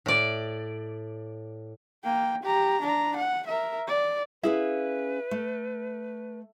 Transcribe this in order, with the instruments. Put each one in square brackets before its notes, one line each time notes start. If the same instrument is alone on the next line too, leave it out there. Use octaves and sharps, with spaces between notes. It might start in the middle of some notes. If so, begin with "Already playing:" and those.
[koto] A2 D5
[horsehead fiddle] A#3 G5
G4 A#5
D4 A#5
F#5
A#4 E5
D5
[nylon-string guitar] C#4 G#4 F5 [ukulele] E4 [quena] B4
[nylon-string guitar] A3